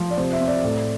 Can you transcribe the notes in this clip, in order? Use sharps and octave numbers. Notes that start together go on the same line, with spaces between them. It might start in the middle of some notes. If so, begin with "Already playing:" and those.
Already playing: F3
D5
C3 C5
E5
C4
D5
A2